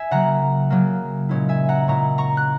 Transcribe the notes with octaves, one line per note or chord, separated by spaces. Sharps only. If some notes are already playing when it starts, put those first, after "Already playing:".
Already playing: E5 G#5
C#3 F#3 A#3 F#5 A#5
C#3 F#3 A#3
A#2 G#3 C#4 E4
E5 G#5
F#5 A#5
A#2 G#3 C#4 E4 A#5 C#6
A#5 C#6
F#6